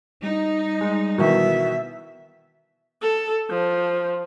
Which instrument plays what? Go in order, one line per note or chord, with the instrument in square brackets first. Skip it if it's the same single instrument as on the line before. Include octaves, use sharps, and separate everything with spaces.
[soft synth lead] G3 [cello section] D#4
[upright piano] G#3
[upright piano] B2 D#3 E3 [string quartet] B3 E5
[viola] A4
F3